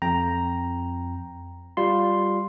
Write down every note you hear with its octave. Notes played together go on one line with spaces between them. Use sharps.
F2 G5 A#5
G3 F4 C6